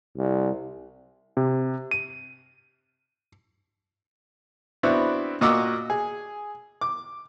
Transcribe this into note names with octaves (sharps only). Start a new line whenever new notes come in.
C2
C3
D#7
B3 C4 D4 E4 F#4
A#2 F#4 D#5 F#5 D6 E6
G#4
D6